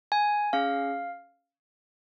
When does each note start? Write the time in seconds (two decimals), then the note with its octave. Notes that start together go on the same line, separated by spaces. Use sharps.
0.12 G#5
0.53 C#4 G#4 F5